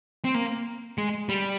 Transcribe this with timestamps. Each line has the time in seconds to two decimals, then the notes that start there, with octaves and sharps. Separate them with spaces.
0.25 C4
0.35 A#3
0.98 G#3
1.29 G3